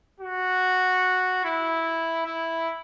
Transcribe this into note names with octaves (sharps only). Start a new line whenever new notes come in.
F#4
E4
E4